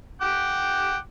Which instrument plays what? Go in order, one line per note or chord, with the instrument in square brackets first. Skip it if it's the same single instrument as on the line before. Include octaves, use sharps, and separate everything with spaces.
[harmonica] F#5 G5 D6